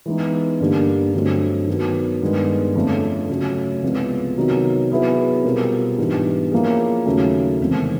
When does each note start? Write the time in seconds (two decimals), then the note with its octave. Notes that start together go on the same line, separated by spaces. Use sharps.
0.06 E3 G#3 B3 D#4
0.60 G2 D3 G3 A#3
1.13 G2 D3 F#3 A3 C4
1.67 D#3 F#3 B3
2.22 G2 D#3 G#3 B3
2.75 F2 D3 F3 A3 C#4
3.29 C#3 F#3 A3
3.83 C2 C3 F3 G#3 B3
4.37 C3 D#3 F#3 B3 D#4
4.91 F#3 B3 E4 G#4 B4
5.44 B2 G3 C4 F4 A#4
5.98 G#2 E3 G3 B3 D4
6.51 F3 A#3 C#4 E4 G#4
7.06 D#2 C#3 F#3 A3 C#4
7.60 E2 C3 D#3 G#3 C4